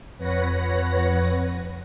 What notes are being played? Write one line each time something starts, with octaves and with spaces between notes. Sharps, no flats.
F2 B4 C#5 F#5 A#6